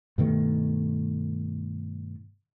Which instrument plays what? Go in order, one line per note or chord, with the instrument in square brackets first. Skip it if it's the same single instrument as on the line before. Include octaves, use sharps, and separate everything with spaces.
[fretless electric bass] G2 B2 D#3 A3